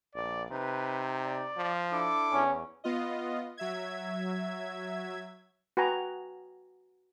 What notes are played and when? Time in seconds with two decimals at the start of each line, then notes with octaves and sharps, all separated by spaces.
0.15 A#1 D5
0.50 C3 D#4 B4
1.24 D5
1.57 F3
1.92 D4 E4 A4 D6
2.33 E2 C#4
2.84 B3 F4 D#5
3.57 F#3 E5 G#6
5.77 F#4 B4 G5 G#5 A#5 C#6